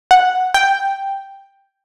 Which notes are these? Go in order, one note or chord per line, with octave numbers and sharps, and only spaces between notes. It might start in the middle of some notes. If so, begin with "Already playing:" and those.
F#5
G5